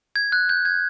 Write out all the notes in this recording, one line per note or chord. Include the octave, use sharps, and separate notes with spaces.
G#6
F#6
G6
G#6